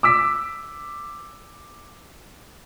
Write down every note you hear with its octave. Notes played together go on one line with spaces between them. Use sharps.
D6 E6 B6